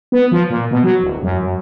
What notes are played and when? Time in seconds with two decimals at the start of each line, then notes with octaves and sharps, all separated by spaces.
0.12 B3
0.32 F3
0.50 A#2
0.71 B2
0.83 F#3
1.01 D1
1.23 F#2
1.42 F#2